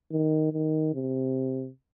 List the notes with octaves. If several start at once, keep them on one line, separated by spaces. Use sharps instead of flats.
D#3
D#3
C3